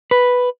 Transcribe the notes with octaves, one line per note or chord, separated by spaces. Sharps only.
B4